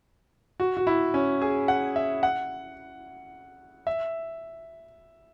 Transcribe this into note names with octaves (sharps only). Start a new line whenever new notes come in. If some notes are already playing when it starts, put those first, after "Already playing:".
F#4
F#4
E4
C#4
G#4
F#5
E5
F#5
E5